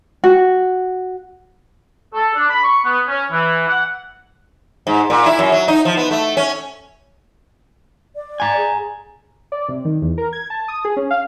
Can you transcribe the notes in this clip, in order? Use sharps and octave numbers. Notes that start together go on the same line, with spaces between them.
F#4
A4
D4
B5
C#6
B3
C#4
E3
F#5
G#2
A#2
E4
F#2
F#3
D#4
F3
B3
A3
C#4
D5
G#5 A#5
G#4
D5
C3
D#3
E2
A#4
G#6
A5
D#6
G#4
C#4
F5